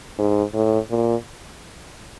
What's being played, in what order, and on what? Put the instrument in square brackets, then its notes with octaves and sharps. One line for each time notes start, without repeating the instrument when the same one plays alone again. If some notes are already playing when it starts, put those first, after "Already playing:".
[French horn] G#2
A2
A#2